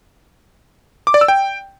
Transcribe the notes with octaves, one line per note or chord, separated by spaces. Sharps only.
D6
D5
E6
G5